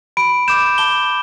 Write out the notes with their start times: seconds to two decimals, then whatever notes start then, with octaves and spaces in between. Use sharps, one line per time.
0.17 B5 D7
0.48 D6 G6 E7
0.78 A5 G7